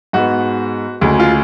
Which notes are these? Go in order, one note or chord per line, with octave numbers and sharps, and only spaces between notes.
G#2 G#3 B3 F#4
D2 C#3 G#3
F4